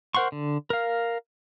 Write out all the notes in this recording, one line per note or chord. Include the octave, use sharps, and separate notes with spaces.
A#4 C5 F#5 C6 C#6
D3
A#4 F5